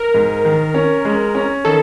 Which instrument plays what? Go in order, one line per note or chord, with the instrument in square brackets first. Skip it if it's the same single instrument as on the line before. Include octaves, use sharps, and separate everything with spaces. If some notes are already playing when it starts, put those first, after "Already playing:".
Already playing: [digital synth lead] A#4
[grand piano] G#2
D#3
C#4
G#3
C#4
[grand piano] D#3 [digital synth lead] A4